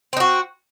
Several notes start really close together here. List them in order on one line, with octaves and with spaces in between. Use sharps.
C4 D#4 F#4